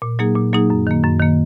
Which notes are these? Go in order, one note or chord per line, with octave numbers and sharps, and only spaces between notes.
A#2
F#3 A#3 D#4 G#4
A#2
F#3 A#3 D#4 G#4
F#2
D#3 A#3
F#2
D#3 A#3